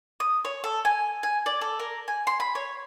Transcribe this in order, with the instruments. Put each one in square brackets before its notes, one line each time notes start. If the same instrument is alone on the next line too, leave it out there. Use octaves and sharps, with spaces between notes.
[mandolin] D#6
C#5
A4
G#5
G#5
D5
A4
A#4
G#5
C6
B5
C#5